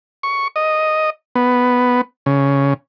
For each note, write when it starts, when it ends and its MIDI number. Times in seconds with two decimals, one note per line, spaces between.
0.23 0.48 85
0.56 1.10 75
1.36 2.01 59
2.26 2.74 49